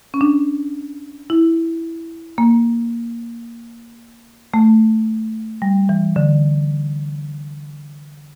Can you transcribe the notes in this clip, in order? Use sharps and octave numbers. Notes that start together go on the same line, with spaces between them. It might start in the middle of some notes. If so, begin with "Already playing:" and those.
C#4
D4
E4
A#3
A3
G3
E3
D3